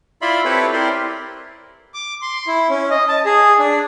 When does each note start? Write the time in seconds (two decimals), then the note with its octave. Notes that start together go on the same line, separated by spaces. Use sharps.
0.22 E4 F4 D5 E5 B5 C6
0.45 C4 E4 G4 A4 B4 C#5
0.73 C4 E4 G4 A#4 D5 C6
1.94 D6
2.22 C6
2.47 E4
2.69 C#4
2.90 D#5
3.09 A5
3.25 G#4
3.59 D4